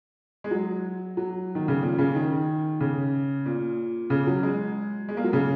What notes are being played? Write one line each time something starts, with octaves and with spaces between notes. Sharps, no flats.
G#3
F#3
F#3
D#3
C#3
A#2
C#3
D#3
C#3
A#2
C#3
F#3
G#3
G#3
A#3
F#3
C#3